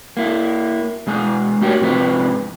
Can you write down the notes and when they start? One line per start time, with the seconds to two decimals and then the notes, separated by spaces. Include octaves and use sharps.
0.17 A#3 E4
1.07 B2 G#3 G#4
1.61 A3 F#4 G4 A#4 C#5
1.80 G#2 C3 F3 B4